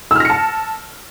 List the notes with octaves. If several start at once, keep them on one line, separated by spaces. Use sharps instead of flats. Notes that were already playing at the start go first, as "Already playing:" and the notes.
A5 E6 F6 A#6 C#7